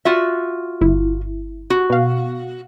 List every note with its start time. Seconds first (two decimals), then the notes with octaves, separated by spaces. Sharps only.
0.05 F4 F#4 E5
0.81 G1 E4
1.70 F#4
1.90 B2 F5